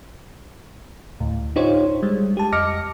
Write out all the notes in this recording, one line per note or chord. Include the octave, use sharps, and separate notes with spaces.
D2 A2
D4 D#4 F4 G4 C5 C#5
G3 G#3
G4 A5
F2 D#5 D6 F6 A#6 C#7